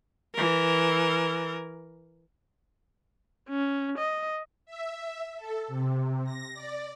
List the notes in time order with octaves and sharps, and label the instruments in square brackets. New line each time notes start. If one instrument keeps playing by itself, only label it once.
[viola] E3 A#4
[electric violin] C#4
D#5
[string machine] E5
A4
C3
A#6
D5